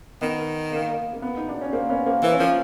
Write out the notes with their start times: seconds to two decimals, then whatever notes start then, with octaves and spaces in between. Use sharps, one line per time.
0.21 D#3 B3
0.72 A#3
1.13 A#3
1.22 B3
1.37 D#4
1.49 D4
1.61 C#4
1.73 A#3 C4
1.89 B3 C#4
2.06 A#3 C4
2.23 E3 A#3 C4
2.32 C#4
2.39 F3 A#3 C4